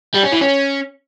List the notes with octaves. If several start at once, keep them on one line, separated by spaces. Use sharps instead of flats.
G3
C#4
E3
C#4